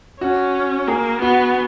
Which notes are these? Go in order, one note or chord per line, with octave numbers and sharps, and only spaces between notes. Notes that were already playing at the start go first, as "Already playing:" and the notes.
C#4 F#4
A#3 G#4
B3 F#4